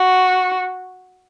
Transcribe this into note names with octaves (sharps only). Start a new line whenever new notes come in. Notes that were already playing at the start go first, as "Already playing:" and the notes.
Already playing: F#4